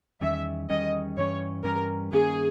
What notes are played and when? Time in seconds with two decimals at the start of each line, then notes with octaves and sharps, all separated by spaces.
0.21 E2 D#3 G3 C#4 E5
0.70 E2 D#3 G3 C#4 D#5
1.17 G2 E3 G3 C#4 C#5
1.64 G2 E3 G3 C#4 A#4
2.12 G2 D#3 A#3 C#4 G#4